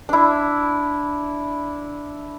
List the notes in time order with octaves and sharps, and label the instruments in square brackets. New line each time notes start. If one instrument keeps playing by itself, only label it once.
[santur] D4 E4